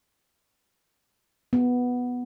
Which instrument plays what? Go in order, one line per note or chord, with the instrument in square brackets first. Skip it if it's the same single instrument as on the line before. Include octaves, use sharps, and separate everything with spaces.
[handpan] B3